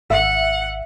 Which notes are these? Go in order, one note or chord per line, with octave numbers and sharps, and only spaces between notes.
G#1 E5 F#5